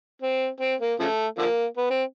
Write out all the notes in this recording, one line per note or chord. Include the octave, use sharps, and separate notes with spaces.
C4
C4
A#3
C#3 F3 A3
D3 F3 A#3
B3
C4